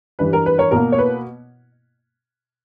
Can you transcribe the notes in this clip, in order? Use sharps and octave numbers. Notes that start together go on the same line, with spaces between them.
G2 E3 G3 B4
A#4
B4
A#4 C#5
B2 A#3 A#4
C#5
B4